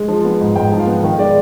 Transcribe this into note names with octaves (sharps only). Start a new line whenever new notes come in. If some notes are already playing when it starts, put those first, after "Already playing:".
Already playing: G#3
F3
B3
G#2
G#2 G5
F3
F5
B3
D#3
G#3 D5